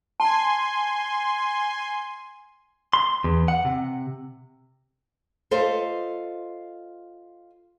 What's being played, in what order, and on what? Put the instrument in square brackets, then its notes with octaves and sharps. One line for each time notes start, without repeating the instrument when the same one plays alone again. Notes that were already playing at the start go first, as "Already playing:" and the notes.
[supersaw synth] G#5 C6 [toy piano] A5
[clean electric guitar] C6
E2
F#5
C3
[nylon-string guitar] F4 A4 C5 D#5 E5